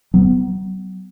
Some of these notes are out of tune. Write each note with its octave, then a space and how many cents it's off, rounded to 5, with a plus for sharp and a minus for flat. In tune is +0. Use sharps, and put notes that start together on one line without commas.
F#3 +40 B3 +20